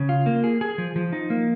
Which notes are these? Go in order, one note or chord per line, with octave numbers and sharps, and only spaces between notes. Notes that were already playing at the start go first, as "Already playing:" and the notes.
Already playing: C#3
F4
A#3
G#4
G#4
F3
F3
D#4
A#3